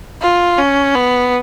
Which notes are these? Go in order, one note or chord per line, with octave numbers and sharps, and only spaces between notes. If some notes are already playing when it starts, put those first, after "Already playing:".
F4
C#4
B3